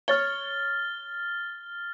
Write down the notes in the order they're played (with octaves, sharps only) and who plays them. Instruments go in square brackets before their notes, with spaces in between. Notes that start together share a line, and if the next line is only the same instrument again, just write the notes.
[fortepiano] C#5 [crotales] F6 A6 G7